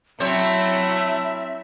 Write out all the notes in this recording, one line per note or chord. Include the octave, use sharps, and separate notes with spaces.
F#3 A3 C4 E4 C5 C#5 E5